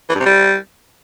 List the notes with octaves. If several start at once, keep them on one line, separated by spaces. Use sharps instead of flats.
E3
G2
C3
G3